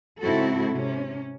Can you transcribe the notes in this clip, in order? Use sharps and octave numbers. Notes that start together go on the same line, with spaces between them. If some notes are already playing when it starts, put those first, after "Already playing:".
G#2 C#3 C4 E4 F#4 A4
C3 C#4